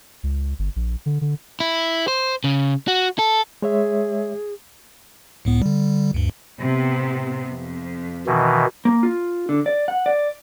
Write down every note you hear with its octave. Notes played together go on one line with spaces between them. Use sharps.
C#2
G1
A#1
D3
D3
E4
C5
C#3
F#4
A4
G#3 G#4 C#5 E5
C#2 A2 B3
D3 G3
D2 G2
A2 C3 B3
F2
B2 D#3 E3
A#3
F4
D3
D5
F#5
D5